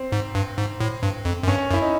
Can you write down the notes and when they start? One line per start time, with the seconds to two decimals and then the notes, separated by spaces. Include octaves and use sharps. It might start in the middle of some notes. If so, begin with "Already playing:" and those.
Already playing: C4
0.12 G#2
0.35 G2
0.58 G#2
0.80 A2
1.03 G2
1.25 F2
1.43 F#2
1.48 G2 C#4
1.71 F#2
1.74 E4
1.82 D#4